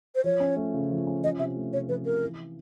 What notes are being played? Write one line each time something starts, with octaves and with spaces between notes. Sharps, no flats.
C5
F3 C#5
C#4
A3
C#3
F3
C#4
F3 D#5
C3 E5
A3
C3 C#5
F3 B4
C3 A#4
E3